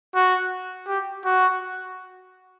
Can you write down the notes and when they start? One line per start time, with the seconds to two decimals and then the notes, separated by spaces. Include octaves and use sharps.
0.15 F#4
0.87 G4
1.25 F#4